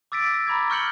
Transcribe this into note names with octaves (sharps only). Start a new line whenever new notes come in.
D6 E6 A6 B6 D7
A#6
A#5 B5 D6 G#6
C#6 F6 G6 C#7 F#7 G7